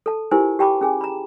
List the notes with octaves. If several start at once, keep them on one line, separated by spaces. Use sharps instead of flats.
A4 A5
E4 F4 G4 A#4 C5 G#5
G4 G5 A5 B5 D6
C#4 G#4 G#5
A#5 B5